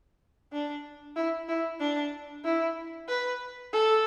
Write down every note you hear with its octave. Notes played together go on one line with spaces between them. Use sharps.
D4
E4
E4
D4
E4
B4
A4